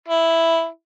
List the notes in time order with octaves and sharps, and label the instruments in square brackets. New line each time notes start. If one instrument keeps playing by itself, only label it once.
[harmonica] E4